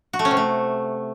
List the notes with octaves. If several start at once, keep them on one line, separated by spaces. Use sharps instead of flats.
F#4
A3
C#4
C3
A3